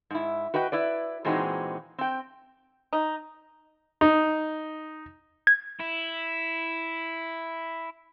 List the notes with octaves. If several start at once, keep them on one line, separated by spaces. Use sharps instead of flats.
G#2 E4
F#4 B4 D#5 G5
E4 B4 D5
A#2 E3 G#3 C4 D#4 F#4
C4 G5
D#4
D#4
G#6
E4